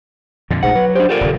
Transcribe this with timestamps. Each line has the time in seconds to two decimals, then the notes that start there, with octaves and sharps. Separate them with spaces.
0.50 F2 A#2 D3
0.63 A#1 G#2 B2 A3 F#5
0.75 F#3 B4
0.95 D4 G4 C5
1.09 A#2 G4 A4 D5
1.21 D#1 C#3